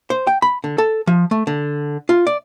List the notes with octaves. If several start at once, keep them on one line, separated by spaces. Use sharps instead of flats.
C5
G5
B5
D3
A4
F3
A3
D3
F4
D5